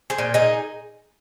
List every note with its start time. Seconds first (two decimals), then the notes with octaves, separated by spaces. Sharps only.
0.10 G#4 C5
0.18 A#2
0.34 D#4 G#4